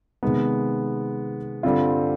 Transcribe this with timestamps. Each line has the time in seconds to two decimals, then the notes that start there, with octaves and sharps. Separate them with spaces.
0.23 C3 D#3 G#3 B3
1.63 G2 D3 G3 C4 F4